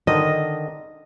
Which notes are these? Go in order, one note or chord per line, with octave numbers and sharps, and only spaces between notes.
D3 D#3 D#5